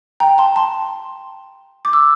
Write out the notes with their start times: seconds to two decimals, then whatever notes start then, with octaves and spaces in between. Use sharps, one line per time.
0.20 G5 A#5
0.38 A5 C6
0.56 A5 C6
1.85 D6
1.93 E6